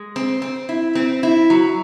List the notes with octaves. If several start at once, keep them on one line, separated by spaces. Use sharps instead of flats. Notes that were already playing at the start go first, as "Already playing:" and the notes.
Already playing: G#3
C4
C4
E4
C4
E4
F#3